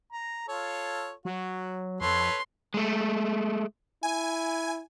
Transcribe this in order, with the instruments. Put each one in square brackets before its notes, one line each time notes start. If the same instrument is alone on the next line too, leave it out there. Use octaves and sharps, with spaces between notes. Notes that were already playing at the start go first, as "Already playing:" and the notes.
[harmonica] A#5
F4 A4 C#5
[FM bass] F#3 [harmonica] F#4
[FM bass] F2 [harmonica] A4 B4 C#5 [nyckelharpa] C6
[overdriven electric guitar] G#3 A3
[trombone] E4 [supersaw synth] G#5